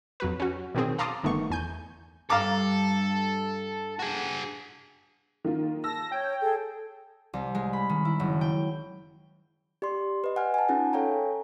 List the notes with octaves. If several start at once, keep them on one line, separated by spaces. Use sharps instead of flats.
F2 F#3 B4
C#4 F#4
B2 D#3 F#3 C4 G#4
F5 A5 A#5 C6 D6 D#6
G1 D#3 A3 B3 C#6
E2 G#5 G6
G2 A4 F5 A#5 D6
F#4 G#4
D#3 A#3 F4
A5 E6 A#6
C#5 G5
G#4 A4
C2
G#3
B5
D#3
E4
F#1
G5
G4 D5 C6
B4 D#5
F#5 G#5 F6
G#5 A5
C#4 D#4 F4 G#4 F#5
A4 C#5 F5 G5 G#5 A#5